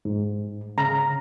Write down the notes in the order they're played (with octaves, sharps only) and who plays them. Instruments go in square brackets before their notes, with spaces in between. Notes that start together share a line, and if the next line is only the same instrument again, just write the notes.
[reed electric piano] G#2
[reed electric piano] C#3 [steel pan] A#5